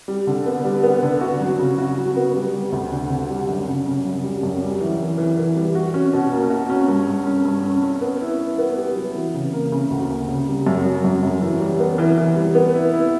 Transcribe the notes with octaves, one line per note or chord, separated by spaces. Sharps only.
G3
D3
B3
G3
B3
D3
F#4
F#3
C#3
F#4
F#3
B3
G3
G3
D2
D3
D3
G3
F#2
C#3
C#3
F#2
G3
F#2
G3
E3
E3
E3
E3
G3
F#4
C#4
B2
A#3
F#4
C#4
G2
G2
C#4
G2
C#4
C#4
B3
E4
E4
B3
G4
F#3
E3
C#3
A#3
C#3
D2
A#3
C#3
G3
F#2
F#2
F#2
F#2
E3
G3
B3
E3
E3
G3
B3
E4
E4